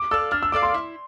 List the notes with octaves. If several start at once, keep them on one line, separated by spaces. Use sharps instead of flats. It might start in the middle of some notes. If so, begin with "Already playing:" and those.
Already playing: D6
A4 D5 F5 E6
D4 F6
E6
A4 D5 F5 D6
C6
E4